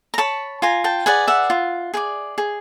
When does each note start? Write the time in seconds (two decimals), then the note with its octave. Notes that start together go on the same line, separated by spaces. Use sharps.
0.14 A#5
0.18 C#5 A5 B5
0.62 F4 G#5 A#5
0.84 G5 A5
1.06 G#4 B4 D5 F#5 G#5
1.28 E5 F#5
1.50 F4
1.94 G#4 B4 D5
2.38 G#4